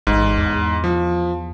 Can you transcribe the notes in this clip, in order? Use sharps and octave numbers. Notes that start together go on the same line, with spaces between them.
A1 G#2
E2
F3